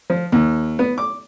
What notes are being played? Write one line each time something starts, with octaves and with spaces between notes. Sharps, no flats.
F3
D#2
B3
D6